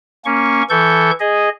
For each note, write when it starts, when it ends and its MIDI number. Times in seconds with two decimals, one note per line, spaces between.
0.25 0.62 58
0.25 0.62 61
0.25 0.62 85
0.70 1.11 52
0.70 1.11 69
0.70 1.11 85
0.70 1.11 91
1.20 1.49 68
1.20 1.49 75